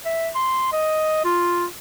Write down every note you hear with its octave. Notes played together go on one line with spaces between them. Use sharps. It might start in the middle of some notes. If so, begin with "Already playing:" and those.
E5
C6
D#5
F4